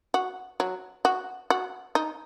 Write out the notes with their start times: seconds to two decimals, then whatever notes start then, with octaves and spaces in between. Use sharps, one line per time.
0.14 F#4
0.60 F#3
1.05 F#4
1.50 F#4
1.95 D#4